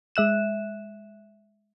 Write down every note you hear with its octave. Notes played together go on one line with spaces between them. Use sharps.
G#3 E5 F#6 E7